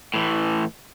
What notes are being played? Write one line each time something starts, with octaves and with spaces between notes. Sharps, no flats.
A2 E3